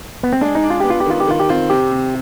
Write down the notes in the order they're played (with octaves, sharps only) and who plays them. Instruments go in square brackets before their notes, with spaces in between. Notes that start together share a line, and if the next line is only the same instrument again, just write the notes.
[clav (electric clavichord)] B3
C4
[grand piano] G#3 [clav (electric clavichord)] D4
[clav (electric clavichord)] D#4
[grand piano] D4
[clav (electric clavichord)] F4
[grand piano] B3 [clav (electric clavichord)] G4
[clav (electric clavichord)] F4
G4
[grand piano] D#3 [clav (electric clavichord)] F4
[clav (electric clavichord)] G4
[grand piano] D#3 [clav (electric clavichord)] F4
[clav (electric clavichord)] G4
[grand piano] C4 [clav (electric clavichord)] F4
[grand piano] C3 [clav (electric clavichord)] G4
[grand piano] C3